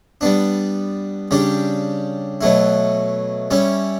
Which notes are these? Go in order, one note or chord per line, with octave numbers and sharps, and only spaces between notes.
G3 B3 D4
C#3 G3 D4 G4
B2 F#3 A3 E4
G3 C#4 E4